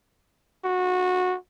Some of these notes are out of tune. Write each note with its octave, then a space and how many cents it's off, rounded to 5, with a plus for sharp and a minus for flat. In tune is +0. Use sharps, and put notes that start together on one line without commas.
F#4 -20